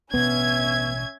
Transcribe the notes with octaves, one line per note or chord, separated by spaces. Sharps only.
A1 B2 B3 C#4 D4 E5 G#6